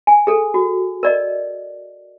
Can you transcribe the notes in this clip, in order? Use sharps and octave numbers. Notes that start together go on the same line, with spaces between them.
G#5
G#4 A4
F#4
A#4 D5 D#5